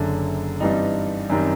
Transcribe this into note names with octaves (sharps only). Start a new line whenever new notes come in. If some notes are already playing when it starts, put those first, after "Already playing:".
Already playing: F#1 F#2 D3
G2 E3 G3 C4 D#4
F#2 D#3 G3 C4